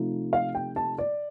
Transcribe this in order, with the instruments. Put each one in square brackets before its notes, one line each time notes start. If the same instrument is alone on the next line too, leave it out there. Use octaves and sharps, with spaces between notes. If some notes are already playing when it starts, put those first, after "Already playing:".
Already playing: [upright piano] C3 F3 A3 D#4
F5
G5
A5
D5